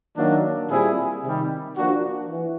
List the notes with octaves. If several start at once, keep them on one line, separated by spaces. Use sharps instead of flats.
D#3 F#3 A#3 D4
A#2 G3 C4 E4 G#4
C3 D#3 G3
F3 A#3 D4 F#4
E3